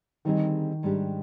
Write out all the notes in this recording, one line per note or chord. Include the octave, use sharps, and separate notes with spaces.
D3 D#3 G3 C4 D#4 G#4
G#2 G3 D4 G4